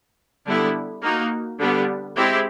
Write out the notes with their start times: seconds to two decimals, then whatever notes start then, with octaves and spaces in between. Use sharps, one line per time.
0.47 D3 G3 B3 E4
1.02 A#3 D#4 F#4
1.59 D3 G3 B3
2.16 G#3 C4 E4 G4